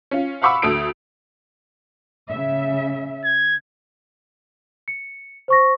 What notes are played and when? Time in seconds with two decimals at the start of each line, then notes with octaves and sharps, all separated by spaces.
0.11 C#4 F4
0.42 F5 F#5 B5 C#6 D6 E6
0.62 D2 A4 D#6 D7
2.29 C#3 E5
3.24 G#6
4.88 C#7
5.48 C5 C#6 A#6